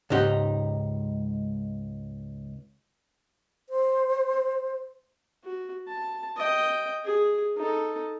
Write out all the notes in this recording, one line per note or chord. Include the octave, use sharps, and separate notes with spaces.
C#2 G#2 D#4 G4 F#5
C5
F#4
A5
D#5 G5
G#4
D#4 A4